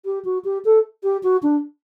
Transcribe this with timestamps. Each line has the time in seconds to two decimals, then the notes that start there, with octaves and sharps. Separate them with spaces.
0.05 G4
0.25 F#4
0.45 G4
0.65 A4
1.03 G4
1.23 F#4
1.43 D4